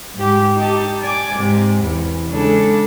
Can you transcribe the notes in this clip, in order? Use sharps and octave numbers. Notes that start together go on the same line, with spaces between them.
G#2 G4
D#4 G4 A5
D5 G#5 D6
G#2 C3
E2
C#3 G#3 D4 A4